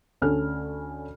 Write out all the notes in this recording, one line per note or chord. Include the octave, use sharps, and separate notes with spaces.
D2 C#4 A4 F6